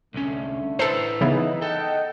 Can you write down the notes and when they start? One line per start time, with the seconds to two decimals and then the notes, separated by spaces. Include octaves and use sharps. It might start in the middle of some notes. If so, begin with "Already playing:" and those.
0.14 C2 D3 A3 C#4
0.79 E4 A4 B4 C5 A#5
1.21 C#3 E3 B3 D#4
1.62 A4 D#5 F#5 G5